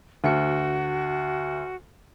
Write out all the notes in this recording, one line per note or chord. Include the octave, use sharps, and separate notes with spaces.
D2 F#4 C#7